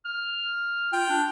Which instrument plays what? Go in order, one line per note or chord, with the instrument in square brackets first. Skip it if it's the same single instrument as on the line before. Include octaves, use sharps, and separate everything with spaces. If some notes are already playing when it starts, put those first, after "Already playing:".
[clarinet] F6
[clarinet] F4 [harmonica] G5
[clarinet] D4